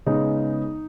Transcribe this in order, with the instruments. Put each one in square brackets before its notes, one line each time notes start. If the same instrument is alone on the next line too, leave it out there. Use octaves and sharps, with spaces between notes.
[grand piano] C#3 G#3 B3 D#4